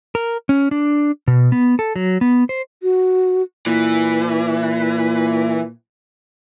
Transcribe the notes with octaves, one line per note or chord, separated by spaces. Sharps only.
A#4
C#4
D4
B2
B3
A4
F#3
B3
C5
F#4
A#2 E3